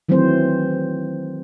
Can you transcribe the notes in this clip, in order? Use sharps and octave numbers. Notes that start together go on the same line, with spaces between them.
D#3 E3 F#3 A3 C4 C5